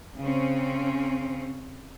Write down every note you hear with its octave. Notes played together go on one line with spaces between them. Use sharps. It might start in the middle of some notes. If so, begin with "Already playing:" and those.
C#3 C4 C#4